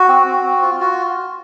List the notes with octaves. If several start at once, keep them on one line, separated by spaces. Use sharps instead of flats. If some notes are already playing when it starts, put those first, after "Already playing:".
Already playing: F#4
C4
C4
C4
F4
F4 F#4